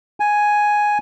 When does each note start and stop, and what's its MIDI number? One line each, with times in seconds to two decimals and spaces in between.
0.20 0.98 80